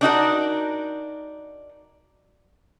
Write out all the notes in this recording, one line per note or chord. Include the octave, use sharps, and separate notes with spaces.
D4 D#4 F#4 A#4